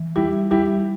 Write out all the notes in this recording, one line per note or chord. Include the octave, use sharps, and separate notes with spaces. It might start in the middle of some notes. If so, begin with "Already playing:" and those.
Already playing: E3
G3 E4 G4
G3 E4 G4